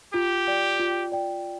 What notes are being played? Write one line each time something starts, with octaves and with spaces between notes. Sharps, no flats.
F4 G4
D5 G5
F4
D5 G5